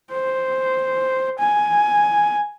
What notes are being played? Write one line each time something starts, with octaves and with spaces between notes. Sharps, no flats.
C5
G#5